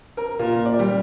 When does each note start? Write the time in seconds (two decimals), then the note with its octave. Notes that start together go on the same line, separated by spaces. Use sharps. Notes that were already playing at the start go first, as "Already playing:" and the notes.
0.17 A#4
0.39 A#2
0.65 D5
0.79 G3